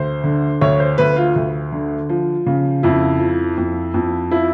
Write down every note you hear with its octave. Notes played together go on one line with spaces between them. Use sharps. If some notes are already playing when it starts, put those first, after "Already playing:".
Already playing: D2 C5
D3
D2 C#5
C5
D2 B4
F4
D2
D3
F3
C#3
F2 E4
F3
F2
F2
F3 E4